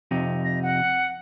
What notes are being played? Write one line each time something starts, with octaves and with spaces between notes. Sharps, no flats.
F2 C3 D#4
A#6
F#5